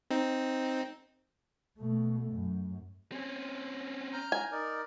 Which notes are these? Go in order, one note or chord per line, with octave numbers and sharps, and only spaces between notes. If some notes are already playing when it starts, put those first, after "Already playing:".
C4 D#4
B2 A3
F#2
C4 C#4
A#5 F6 G6
G#5
D#4 A#4 D5